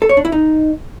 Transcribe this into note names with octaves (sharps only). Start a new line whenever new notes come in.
A4
C#5
D4
E4
D#4